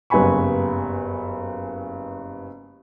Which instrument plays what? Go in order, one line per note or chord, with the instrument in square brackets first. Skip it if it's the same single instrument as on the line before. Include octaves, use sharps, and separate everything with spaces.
[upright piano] F#1 G2 B3 G#5 B5 C#6